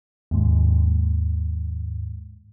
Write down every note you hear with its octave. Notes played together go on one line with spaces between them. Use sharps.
D#2 G#2